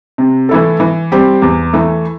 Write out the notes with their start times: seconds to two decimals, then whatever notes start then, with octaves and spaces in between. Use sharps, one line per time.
0.18 C3
0.49 E3 A3 E4 A4
0.80 E3
1.12 G3 C4 G4
1.42 E2
1.73 E3 A3